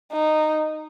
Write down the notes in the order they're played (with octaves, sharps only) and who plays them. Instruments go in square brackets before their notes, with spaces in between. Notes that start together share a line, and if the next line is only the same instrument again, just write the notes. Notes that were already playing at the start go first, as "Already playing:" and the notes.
[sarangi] D#4